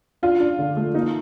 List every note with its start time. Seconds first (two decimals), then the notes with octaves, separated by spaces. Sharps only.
0.23 D4 F4
0.40 D4
0.59 D3
0.77 A3
0.94 A#3 D#4